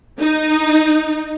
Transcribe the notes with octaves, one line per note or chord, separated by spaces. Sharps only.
D#4